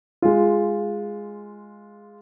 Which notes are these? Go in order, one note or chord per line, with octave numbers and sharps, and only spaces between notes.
G#3 F4